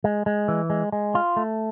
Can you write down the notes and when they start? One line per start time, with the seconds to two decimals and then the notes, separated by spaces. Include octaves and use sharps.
0.04 G#3
0.26 G#3
0.48 E3
0.70 G#3
0.92 G#3
1.15 F4
1.36 A3